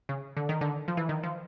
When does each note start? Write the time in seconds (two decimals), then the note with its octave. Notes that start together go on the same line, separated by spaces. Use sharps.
0.09 C#3
0.37 D3
0.49 D#3
0.61 D3
0.88 F3
0.97 E3
1.09 D#3
1.23 F3